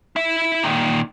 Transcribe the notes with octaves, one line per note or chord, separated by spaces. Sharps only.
E4 E5
A#2 D#3